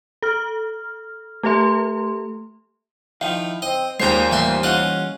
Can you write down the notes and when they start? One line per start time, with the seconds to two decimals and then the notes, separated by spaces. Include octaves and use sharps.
0.23 A4 F6
1.43 A3 G4 A4 E5 C6
3.21 D#3 F3 E4 F5
3.62 C4 D#5
4.00 D#2 A#2 G#3 C5 C#5 G5 A#5 C7
4.32 A2 E3 G3 A#3 E5 C6
4.63 C#4 F4 D#5 F#5